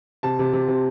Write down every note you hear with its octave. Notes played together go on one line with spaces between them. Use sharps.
C3 A5
C3
C3
C3